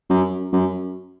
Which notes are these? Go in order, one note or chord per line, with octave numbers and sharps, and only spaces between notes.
F#2
F#2